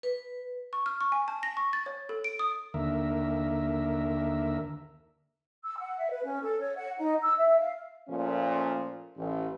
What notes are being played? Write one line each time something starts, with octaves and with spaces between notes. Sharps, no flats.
B4
C#6
F6
C#6
G#5
A5
A#6
C#6
A6
C#5
A4
D7
D#6
D#2 D3 A#4 E5
E6
F#5
E5
B4
C#4
A4
C#5
F#5
D#4
E6
E5
F5
A#2 F3 A3 C#4
A1